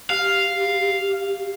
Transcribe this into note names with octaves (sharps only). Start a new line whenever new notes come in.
G4 F5